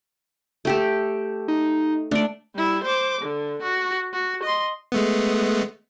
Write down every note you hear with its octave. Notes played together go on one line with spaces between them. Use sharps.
A3 G4 A4
D#4
A3 D4 D5
G3 E4
C5 D6
D3
F#4
F#4
D#5 C6
G#3 A3 B3